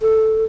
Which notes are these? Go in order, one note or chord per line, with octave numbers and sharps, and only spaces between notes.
A4